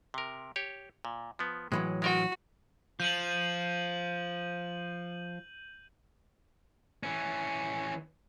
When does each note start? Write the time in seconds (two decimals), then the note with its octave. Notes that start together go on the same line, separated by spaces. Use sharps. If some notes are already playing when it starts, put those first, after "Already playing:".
0.14 C3 A#4
0.56 G4 C#5
1.05 A#2
1.39 F3 B3
1.72 A2 E3 F#3 G#3
2.02 G#3 F#4 A#4 G5
3.00 F3 G6 D#7 F#7
7.03 E3 C#4